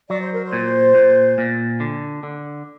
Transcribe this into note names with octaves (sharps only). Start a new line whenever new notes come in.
F#3 D5
C5
A#4
C5
A#2
A#2
A#2
D3
D3